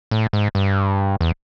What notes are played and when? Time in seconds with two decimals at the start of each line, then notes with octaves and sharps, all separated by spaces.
0.11 A2
0.33 G#2
0.55 G2
1.21 E2